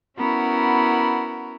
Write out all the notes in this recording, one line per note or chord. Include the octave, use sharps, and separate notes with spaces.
B3 C#4 E4 F#4 A#4